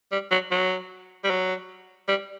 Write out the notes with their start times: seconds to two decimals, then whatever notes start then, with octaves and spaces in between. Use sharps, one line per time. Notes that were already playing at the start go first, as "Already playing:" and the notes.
0.12 G3
0.31 F#3
0.51 F#3
1.24 G3
1.30 F#3
2.08 G3